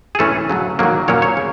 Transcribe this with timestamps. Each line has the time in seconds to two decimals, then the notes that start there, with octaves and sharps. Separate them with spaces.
0.15 G#4
0.19 E3 A3 C#4 A4
0.50 C#3 F#3 A3
0.79 D#3 F#3 A#3
1.08 A#2 F#3 A#3 C#4 C#5
1.22 C#5
1.37 C#3